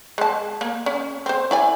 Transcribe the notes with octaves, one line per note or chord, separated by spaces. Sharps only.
G#3 A5
A#3
C#4
C4 C5
E4 D5 G#5